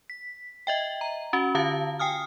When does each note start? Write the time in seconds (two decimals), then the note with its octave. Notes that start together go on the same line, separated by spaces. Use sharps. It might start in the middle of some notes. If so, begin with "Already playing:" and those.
0.10 B6
0.67 D#5 E5 G5
1.01 A#5
1.33 C#4 F#4
1.55 D3 F4 F5 A5
1.99 G5 G#5 D#6 F6